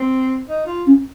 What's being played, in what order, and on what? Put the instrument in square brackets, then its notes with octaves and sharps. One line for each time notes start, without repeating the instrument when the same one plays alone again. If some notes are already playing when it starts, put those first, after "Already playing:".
Already playing: [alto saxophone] C4
D#4
F4
[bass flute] C#4